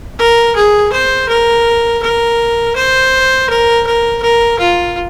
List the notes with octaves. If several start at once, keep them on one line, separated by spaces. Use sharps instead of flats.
A#4
G#4
C5
A#4
A#4
C5
A#4
A#4
A#4
F4